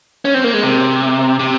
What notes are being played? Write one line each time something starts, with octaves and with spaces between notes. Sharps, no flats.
C#4
C4
A#3
G#3
C3
C3